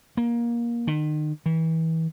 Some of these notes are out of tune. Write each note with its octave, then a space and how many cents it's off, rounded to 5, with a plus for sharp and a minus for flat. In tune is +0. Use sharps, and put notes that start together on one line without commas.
A#3 +20
D#3 -35
E3 -30